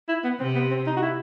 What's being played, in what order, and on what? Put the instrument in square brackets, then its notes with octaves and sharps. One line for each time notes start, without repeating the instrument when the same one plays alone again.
[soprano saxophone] E4
B3
[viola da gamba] C3 [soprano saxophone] C4
[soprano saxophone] B3
C4
D#4
F#4
E4